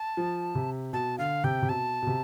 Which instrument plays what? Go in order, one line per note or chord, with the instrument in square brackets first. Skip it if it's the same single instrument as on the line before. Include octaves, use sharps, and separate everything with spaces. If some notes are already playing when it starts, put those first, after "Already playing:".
Already playing: [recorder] A5
[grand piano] F3
C3
[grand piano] B2 [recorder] A5
[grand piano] D3 [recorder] F5
[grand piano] C3 [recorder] G5
[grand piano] C3
[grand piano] B2 [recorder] A5
[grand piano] B2
C3